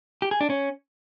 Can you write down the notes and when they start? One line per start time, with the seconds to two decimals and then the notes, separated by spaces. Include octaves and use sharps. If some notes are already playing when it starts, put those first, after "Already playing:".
0.22 G4
0.31 G#4
0.41 D4
0.50 C#4